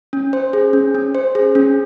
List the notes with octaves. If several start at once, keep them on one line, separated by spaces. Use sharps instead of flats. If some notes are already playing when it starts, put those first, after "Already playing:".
C#4
C5
G#4
C#4
C#4
C5
G#4
C#4